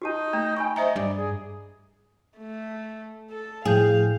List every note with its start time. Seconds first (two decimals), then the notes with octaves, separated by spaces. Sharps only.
0.02 D#4 F#4 G4 A5
0.33 A3 A#5
0.57 G5 G#5 B5 C#6
0.76 C5 D#5 E5 A#5
0.96 G2 D5
1.16 G#4
2.38 A3
3.30 A4
3.65 A2 F3 G#4 F5 G6